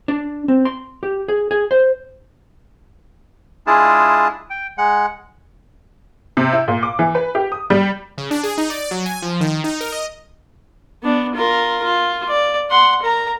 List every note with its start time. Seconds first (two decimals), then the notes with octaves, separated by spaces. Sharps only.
0.08 D4
0.48 C4
0.65 C6
1.03 G4
1.28 G#4
1.51 G#4
1.71 C5
3.67 G#3 D4 E4 F4 G#4 A5
4.50 G5
4.78 G#3 F#5
6.37 C3
6.53 E4
6.68 A#2
6.83 D6
6.99 E3
7.15 B4
7.35 G4
7.52 D#6
7.70 G3
8.18 C#3
8.31 D4
8.43 G#4
8.58 D#4
8.70 D5
8.91 F#3
9.06 G#5
9.22 F3
9.41 D#3
9.64 D#4
9.81 A#4
9.92 D#5
11.03 B3 D4
11.35 F4 A#4
11.84 F4
12.29 D5
12.70 F#5 C6
13.03 A#4 A#5